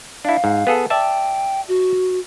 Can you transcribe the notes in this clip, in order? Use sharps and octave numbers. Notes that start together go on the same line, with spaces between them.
D4 E4 F5
G#2
B3 G#4 A4
D5 E5 G5 A5
F#4